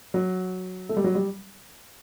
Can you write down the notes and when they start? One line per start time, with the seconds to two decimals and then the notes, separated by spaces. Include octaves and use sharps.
0.14 F#3
0.89 A3
0.97 G3
1.04 F#3
1.15 G3